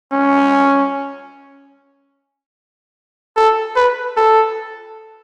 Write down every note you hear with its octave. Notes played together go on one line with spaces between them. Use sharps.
C#4
A4
B4
A4